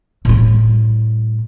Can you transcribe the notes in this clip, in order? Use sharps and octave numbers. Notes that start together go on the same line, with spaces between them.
A2 G3